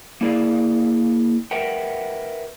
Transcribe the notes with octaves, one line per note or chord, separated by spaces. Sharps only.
A#3 E4 G#4 D5 F5
A#4 B4 E5 F#5 G5